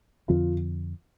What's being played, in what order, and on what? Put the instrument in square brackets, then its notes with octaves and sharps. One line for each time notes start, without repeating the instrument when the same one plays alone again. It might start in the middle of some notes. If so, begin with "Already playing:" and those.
[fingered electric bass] F2 D3 F3 C4 [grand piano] F4